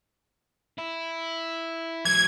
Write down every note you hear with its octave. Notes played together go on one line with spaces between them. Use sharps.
E4
E3 F#3 G#6